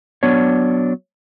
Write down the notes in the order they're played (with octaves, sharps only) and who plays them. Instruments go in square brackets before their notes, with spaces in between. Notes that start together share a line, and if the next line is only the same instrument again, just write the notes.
[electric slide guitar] F#3 B3 D4 C#5